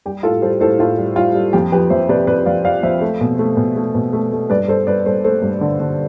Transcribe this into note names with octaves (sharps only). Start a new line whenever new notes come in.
G3 G4
A2 F4 A4
G3 A4 C5
A2 A4 C5
A2 F4 A4
G3
G3 F4
G3
F2 G4
F3 G4 B4
F2 C5 E5
C3 B4 D5
C3 B4 D5
F2 D5 F5
F3 D5 F5
F2 C5 E5
A3
B2
A3
B2
A3
B2
A3
A3
G2 B4 D5
G2 A4 C5
G2 B4 D5
G2 A4 C5
A3 A4 C5
G2
D3
D3